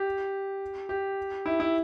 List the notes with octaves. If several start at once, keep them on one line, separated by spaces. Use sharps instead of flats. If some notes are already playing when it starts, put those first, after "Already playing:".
Already playing: G4
G4
E4
E4